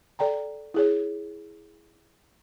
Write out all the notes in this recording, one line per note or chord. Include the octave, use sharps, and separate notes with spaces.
A4 D5 G5 A#5
E4 G#4 C#5